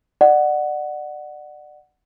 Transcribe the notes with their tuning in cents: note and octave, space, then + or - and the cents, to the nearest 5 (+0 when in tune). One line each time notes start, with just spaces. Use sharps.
D5 +30 F#5 +0